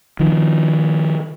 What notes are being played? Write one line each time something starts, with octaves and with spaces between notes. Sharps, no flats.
D#3 F3